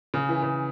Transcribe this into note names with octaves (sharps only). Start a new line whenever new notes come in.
C#3
E3
C#3